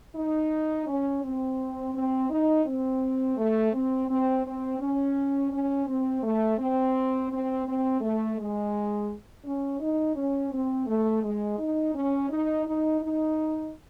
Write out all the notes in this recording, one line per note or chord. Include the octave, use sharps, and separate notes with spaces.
D#4
C#4
C4
C4
D#4
C4
A3
C4
C4
C4
C#4
C#4
C4
A3
C4
C4
C4
A3
G#3
C#4
D#4
C#4
C4
A3
G#3
D#4
C#4
D#4
D#4
D#4